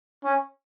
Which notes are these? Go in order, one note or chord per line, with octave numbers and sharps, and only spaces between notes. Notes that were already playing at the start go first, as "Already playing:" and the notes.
C#4